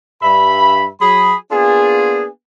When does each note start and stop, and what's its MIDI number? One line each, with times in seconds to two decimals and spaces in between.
0.23 0.87 43
0.23 0.87 76
0.23 0.87 83
1.01 1.35 54
1.01 1.35 68
1.01 1.35 83
1.51 2.26 58
1.51 2.26 59
1.51 2.26 62
1.51 2.26 65
1.51 2.26 68